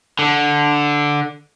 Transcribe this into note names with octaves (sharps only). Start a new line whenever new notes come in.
D3